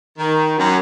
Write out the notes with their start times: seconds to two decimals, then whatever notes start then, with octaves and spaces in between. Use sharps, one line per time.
0.18 D#3
0.58 F#2